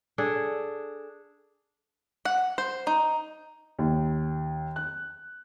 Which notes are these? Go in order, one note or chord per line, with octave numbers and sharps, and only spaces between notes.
D4 G#4 A4
F#5
C5
D#4
D#2
F#6